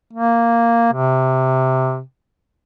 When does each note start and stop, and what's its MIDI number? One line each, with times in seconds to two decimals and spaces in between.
0.13 0.88 58
0.93 2.01 48